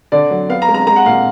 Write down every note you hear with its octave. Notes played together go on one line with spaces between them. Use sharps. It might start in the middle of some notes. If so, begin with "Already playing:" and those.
D3 D5
F#3
B3 F5
A#5
G#3
A#5
G#3 A#5
F#5
A#2 F5